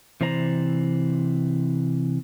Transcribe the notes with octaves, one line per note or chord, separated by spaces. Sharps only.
C3 E3 C5 D5 A#5